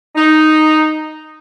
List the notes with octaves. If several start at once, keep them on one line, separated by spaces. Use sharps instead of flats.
D#4